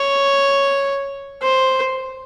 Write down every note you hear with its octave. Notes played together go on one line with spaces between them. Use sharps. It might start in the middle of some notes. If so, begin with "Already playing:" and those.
Already playing: C#5
C5